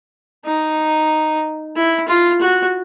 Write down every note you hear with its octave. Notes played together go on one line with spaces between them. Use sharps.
D#4
E4
F4
F#4